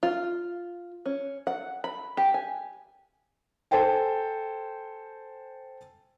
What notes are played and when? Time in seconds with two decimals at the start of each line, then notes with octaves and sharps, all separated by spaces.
0.03 F4
1.06 C#4
1.47 F#5
1.84 B5
2.17 G4
2.34 G#5
3.71 A4 C5 G5 G#5